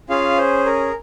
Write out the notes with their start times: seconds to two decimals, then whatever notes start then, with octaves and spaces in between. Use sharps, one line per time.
0.10 C#4 F4 G#4 F5
0.38 C5
0.66 A#4